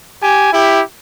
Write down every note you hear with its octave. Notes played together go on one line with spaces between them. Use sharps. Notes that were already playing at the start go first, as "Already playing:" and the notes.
G4 G#5
E4 G4